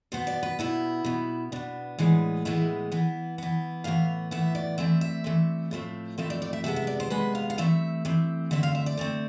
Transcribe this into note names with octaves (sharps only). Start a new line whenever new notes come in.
B2 B3 C5
D5
B4
B2 B3 E4
B2 B3
B2 B3 D4
A2 E3 G#3 B3
A2 E3 G#3 B3 E4
E3 B3
E3 B3
A2 E3 B3 F5
A2 E3 B3 E5
D5
E3 A3 C4 E5
E5
E3 A3 C4
A2 F3 A3 C4
A2 F3 A3 C4 E5
D5
D5
E5
C3 G#3 B3 E5
E5
D5
C5
C3 G#3 B3 B4
F5
F5
E3 A3 C4 E5
E3 A3 C4
D3 A3 C4 E5
F5
E5
D5
D3 A3 C4